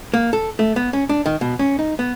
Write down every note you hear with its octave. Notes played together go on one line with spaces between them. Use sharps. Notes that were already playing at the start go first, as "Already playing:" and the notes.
A#3
A4
A3
B3
C#4
D4
D#3
B2
C#4
D#4
B3